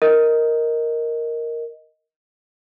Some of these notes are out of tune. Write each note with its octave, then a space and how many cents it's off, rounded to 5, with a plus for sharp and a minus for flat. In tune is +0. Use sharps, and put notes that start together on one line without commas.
A#4 +0 D#5 +10